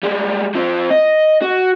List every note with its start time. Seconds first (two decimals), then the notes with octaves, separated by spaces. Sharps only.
0.03 G3 G#3
0.55 F3 C4
0.90 D#5
1.42 F#4